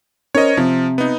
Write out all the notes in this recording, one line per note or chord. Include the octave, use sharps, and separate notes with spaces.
C#4 A#4 C5 C#5 D#5
C3 F3
B3 D#4